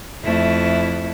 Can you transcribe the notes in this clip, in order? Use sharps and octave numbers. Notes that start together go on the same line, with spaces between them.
F2 A3 E4